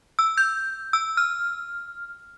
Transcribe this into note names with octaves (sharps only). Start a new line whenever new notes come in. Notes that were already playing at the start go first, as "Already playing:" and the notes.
E6
G6
E6
F6